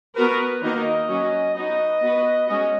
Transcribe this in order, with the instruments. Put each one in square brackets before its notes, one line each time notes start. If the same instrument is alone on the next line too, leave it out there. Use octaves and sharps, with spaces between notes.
[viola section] B3 F#4 A#4 [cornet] B4
[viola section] D#3 A#3 D#4 F#4 A#4 [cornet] D#5
[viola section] F#3 C#4 F#4
[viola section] B3 D#4 F#4 [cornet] D#5
[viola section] B3 F#4 B4
[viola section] G#3 C#4 F#4 [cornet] D#5